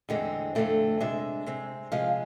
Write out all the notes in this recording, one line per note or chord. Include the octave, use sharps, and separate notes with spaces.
E2 D3 G#3 C4
F2 D3 A3 C4
C3 G#3 D4 E5
C3 G#3 C4
C3 F3 G#3 F5